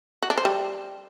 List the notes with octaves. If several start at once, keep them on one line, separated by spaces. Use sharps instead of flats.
F#4
D4
C5
G3